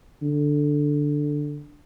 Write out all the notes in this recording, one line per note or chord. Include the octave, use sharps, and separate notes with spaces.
D3